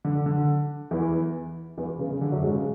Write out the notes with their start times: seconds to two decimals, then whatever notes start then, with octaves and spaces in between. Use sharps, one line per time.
0.05 D3
0.26 D3
0.91 E2 E3
1.78 E2 E3
1.99 C#3
2.11 C#3
2.21 D3
2.32 F#2 F#3
2.43 G#2 G#3
2.54 C#3